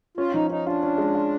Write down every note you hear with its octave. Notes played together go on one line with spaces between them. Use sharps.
C#4 F4
F3 D#4
C#4 D#4
D4 F4
C#4
G#3
F4